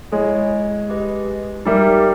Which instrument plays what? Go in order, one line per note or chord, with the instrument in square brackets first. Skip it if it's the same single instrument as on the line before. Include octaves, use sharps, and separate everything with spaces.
[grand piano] G#3 [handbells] E4 G#4 C#5
[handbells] G4 B4 D#5
[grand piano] G3 [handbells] D#4 G4 A#4 E5